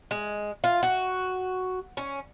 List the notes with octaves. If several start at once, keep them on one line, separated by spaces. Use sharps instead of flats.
G#3
F4
F#4
C#4